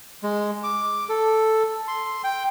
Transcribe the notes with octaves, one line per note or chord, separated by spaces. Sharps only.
G#3
D6
A4
C6
G5